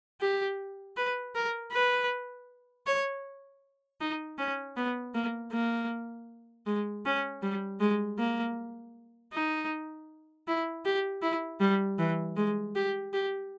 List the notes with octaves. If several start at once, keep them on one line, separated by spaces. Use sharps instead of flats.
G4
B4
A#4
B4
C#5
D#4
C#4
B3
A#3
A#3
G#3
C#4
G3
G#3
A#3
D#4
E4
G4
E4
G3
E3
G#3
G4
G4